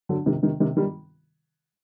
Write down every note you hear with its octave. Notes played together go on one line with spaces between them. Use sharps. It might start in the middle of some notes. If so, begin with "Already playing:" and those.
D3 F#3
C3 D#3
C3 D#3
C3 D#3
D#3 G3